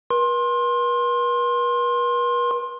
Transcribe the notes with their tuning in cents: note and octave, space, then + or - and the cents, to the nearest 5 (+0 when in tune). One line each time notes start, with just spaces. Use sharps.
B4 -45 C6 +20